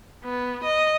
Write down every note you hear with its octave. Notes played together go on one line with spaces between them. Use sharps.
B3
D#5